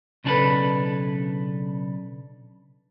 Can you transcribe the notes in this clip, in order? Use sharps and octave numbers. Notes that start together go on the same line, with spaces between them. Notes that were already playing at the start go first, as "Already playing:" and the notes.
B1 C#3 D4 G#4 A4 B4